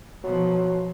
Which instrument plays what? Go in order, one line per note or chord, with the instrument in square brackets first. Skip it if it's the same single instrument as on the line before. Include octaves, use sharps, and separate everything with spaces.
[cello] B2 F3 [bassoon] F#3